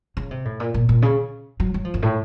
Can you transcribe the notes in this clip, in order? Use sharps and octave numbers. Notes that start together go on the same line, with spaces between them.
C#3
C3
A2
A#2
A#2
A#2
C#3
F#3
F#3
F3
F#2
A2